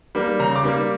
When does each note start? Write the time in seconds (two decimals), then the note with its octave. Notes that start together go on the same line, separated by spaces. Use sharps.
0.15 G3 A#3
0.40 C#3 A#5
0.56 D6
0.63 G3 A#3